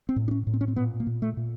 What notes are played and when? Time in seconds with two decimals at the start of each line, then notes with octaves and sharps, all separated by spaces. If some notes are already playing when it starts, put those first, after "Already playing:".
0.09 C4
0.16 A2
0.28 D4
0.31 C#4
0.47 A2
0.54 C4
0.61 C#4
0.68 C4
0.76 A#2 B3
1.00 A#3
1.07 A#2
1.22 A3
1.37 A#2